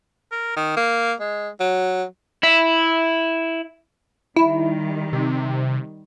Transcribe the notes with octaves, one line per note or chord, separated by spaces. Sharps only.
A#4
D#3
A#3
G#3
F#3
E4 E5
D#3 G3 E4
C3